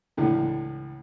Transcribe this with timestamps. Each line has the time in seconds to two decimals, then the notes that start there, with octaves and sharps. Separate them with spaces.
0.17 C#2 A2 D3 E3